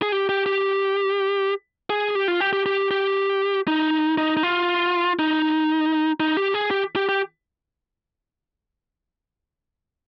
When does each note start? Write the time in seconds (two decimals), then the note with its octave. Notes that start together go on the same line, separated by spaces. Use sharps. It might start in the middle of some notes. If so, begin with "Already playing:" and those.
0.02 G#4
0.12 G4
0.29 G4
0.46 G4
1.90 G#4
2.15 G4
2.28 F4
2.41 G4
2.53 G4
2.66 G4
2.91 G4
3.67 D#4
4.18 D#4
4.37 D#4
4.43 F4
5.19 D#4
6.20 D#4
6.37 G4
6.54 G#4
6.71 G4
6.96 G4
7.09 G4